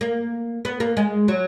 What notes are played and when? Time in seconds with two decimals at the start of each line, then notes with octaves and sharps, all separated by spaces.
0.01 A#3
0.65 B3
0.80 A#3
0.97 G#3
1.28 F#3